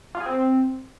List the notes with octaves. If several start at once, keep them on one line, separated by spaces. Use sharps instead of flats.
F4
G#4
C4